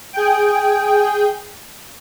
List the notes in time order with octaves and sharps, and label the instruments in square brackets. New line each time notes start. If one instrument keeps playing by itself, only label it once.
[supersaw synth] G#4 G5